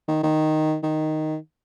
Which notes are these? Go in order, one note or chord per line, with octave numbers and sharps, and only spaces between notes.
D#3
D#3
D#3